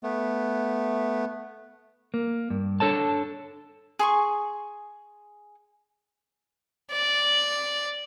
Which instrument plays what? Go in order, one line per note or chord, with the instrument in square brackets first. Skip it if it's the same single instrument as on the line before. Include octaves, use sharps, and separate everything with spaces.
[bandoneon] A3 B3
[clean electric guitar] A#3
G2
D4 A4 C#5 A5
[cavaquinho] G#4 C6 C#6
[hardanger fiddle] D5